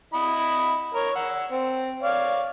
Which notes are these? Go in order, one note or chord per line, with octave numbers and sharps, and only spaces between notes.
E4 D#5 B5
A#4 C#5
F#5 E6
C4
C#5 D5 F5